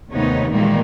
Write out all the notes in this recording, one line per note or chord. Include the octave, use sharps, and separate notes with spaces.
D#2 C3 A3 B3 D#4 C#5
A#2 D#3 E3 G3 G#3 A#3